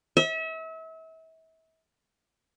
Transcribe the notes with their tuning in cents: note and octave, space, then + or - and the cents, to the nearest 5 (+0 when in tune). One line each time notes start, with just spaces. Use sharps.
E5 -35